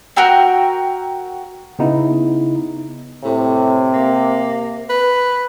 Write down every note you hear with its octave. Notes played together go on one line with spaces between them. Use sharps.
F#4 A#4 G5 E6
C#3 B3 D#4 E4
A2 C3
A#3
B4